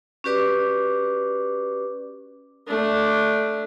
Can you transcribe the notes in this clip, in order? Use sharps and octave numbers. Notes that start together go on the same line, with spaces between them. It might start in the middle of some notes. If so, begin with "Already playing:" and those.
C#4 F#4 G4 B4 D5 D6
A3 D4